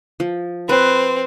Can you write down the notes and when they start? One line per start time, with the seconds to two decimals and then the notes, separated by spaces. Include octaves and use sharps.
0.20 F3
0.69 C4 B4